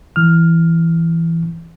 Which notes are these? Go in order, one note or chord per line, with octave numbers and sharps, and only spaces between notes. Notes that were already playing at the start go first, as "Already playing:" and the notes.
E3 F6